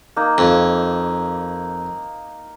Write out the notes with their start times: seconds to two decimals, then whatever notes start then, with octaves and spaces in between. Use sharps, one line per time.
0.16 A#3 D#4
0.38 F2